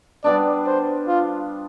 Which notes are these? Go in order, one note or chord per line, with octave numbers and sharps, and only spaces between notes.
G3 B3 D4 D5
C5
F4